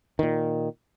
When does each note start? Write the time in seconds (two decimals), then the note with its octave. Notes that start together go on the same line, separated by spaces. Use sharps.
0.19 A#2 D#3